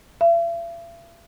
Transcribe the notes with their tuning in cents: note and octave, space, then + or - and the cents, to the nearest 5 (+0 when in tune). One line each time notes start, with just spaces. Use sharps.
E5 +45